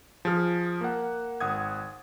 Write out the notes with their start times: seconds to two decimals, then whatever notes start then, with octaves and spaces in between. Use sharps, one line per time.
0.25 F3 G#4 F6
0.81 A#3 F#5
1.40 G#1 F#5 D#6 G#6